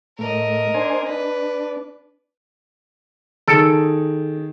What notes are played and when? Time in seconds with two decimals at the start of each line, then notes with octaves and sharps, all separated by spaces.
0.19 A2 A#4 D#5
0.74 D4 C5 G#5
1.09 D4 B4
3.48 D#3 G#4 A4 D7